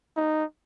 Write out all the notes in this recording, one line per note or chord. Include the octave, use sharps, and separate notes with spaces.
D#4